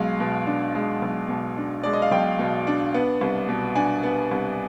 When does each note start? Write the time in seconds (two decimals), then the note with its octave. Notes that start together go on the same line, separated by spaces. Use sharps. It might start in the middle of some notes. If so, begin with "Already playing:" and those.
Already playing: B1 G#3 F5
0.20 B2
0.47 D4
0.75 G#3
1.02 B1
1.29 B2
1.57 D4
1.83 G#3 D5
1.93 D#5
2.02 F5
2.11 B1 G5
2.39 B2
2.67 D4
2.94 B3
3.21 C2
3.49 B2
3.75 D4 G#5
4.03 B3
4.31 C2